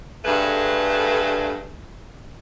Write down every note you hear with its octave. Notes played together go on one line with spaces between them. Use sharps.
G2 D3 A3 G#4 B4